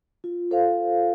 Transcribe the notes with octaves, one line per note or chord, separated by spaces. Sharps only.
F4
A4 C5 F5